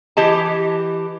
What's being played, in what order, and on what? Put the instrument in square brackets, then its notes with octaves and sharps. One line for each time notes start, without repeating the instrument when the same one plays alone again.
[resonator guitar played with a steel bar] E3 G4 D#5 A5